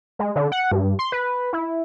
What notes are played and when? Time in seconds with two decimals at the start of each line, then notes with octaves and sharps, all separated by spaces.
0.19 G#3
0.36 D3
0.52 F#5
0.72 G2
0.99 C6
1.12 B4
1.53 E4